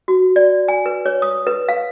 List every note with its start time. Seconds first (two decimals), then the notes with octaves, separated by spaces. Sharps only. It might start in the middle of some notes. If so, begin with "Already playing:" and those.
0.08 F#4
0.36 D5
0.68 G#5
0.86 B4
1.06 C#5
1.22 D#6
1.47 B4
1.69 F5